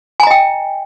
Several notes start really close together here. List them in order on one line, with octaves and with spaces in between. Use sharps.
G#5 A#5 D#5 G5